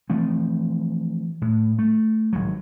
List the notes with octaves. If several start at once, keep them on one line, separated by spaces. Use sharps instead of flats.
E3 F3 A3 C4
A2
A3
G#1 F#3